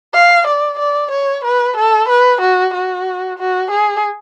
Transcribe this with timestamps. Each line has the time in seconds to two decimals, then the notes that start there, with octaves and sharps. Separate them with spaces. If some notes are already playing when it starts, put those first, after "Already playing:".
0.14 F5
0.47 D5
0.79 D5
1.11 C#5
1.44 B4
1.76 A4
2.08 B4
2.41 F#4
2.74 F#4
3.38 F#4
3.71 G#4